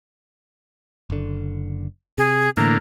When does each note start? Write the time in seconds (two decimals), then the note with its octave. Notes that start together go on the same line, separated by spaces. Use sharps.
1.10 F#1 D3
2.18 C3 G#4
2.57 A2 D3 E3 A#3 A#5